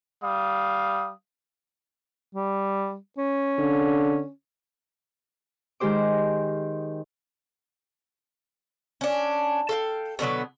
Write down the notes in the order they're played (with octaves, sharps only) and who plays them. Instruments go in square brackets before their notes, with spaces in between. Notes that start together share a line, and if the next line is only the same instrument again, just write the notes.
[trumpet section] G3 F5 D#6
[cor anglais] G3
C#4
[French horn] D3
[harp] D#3 G#3 G4 C5 D6
[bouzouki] C#4 D4
A4 F5 G5
B2 D3 F#3 B3